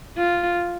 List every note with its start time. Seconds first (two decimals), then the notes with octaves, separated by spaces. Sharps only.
0.17 F4